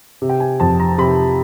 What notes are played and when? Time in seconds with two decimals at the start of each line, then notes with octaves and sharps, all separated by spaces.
0.22 C3
0.29 G5
0.40 G#5
0.60 F2 A5
0.80 A#5
0.98 C3 B5